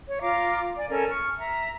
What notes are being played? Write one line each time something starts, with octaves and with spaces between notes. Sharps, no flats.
C#5
F4 F5 A#5 D6
D5 G#5
C#4 A4 A#4 G#5
C#6 F6
E5 A#5